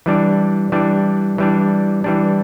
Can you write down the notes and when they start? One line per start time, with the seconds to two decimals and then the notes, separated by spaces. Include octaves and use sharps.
0.06 E3 G3 D4
0.72 E3 G3 D4
1.38 E3 G3 D4
2.04 E3 G3 D4